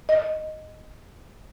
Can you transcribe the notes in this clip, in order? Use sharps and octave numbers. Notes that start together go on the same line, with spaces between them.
D#5